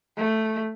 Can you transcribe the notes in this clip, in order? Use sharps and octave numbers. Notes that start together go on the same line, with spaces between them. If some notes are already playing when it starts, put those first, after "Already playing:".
A3